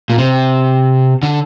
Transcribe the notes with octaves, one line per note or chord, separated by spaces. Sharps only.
A#2
C3
D3